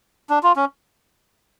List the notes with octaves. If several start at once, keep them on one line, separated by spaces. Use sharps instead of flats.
D4
F4
C#4